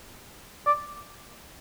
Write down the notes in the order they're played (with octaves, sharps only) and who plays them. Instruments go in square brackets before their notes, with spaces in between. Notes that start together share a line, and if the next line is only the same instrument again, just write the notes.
[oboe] D5